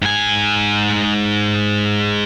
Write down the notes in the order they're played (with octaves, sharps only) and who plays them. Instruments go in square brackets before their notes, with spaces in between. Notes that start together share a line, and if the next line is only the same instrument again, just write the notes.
[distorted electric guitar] G#2 G#5